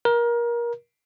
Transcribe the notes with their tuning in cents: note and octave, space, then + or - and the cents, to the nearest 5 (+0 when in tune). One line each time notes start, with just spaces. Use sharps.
A#4 +25